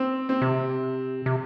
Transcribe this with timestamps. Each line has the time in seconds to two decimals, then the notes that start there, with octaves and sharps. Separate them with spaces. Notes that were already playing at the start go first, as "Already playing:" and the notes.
Already playing: C4
0.29 C4
0.42 C3
1.26 C3